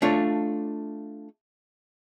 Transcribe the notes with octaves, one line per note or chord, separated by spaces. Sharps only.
A3 D4 F4 C#5